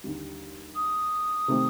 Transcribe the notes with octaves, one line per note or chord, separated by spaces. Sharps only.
D#2 D3 G3
D#6
C3 D#3 A3 C4 G4